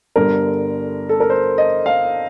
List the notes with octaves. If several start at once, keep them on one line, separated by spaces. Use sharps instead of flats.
G1 G2 D3 A#4
A4
A#4
C5
D#5
F5